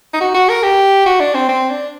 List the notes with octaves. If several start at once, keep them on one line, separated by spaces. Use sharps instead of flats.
D#4
F#4
F#4
A#4
G4
F#4
D4
C4
C4
D4